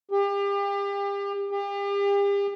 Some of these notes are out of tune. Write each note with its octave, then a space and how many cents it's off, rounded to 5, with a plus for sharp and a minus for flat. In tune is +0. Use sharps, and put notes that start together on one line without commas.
G4 +35
G4 +40